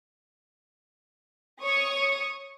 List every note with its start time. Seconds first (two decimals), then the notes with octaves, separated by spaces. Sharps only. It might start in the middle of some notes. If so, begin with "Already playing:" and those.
1.62 C#5 C#6 D#6